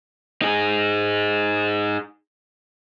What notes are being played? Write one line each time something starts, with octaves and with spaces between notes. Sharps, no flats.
D#4 G#4